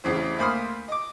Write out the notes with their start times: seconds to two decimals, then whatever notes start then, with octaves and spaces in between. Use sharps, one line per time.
0.04 A1 E2 C#3 C4
0.38 D2 A#3 C5 B5 D#6 F6
0.88 D#5 D6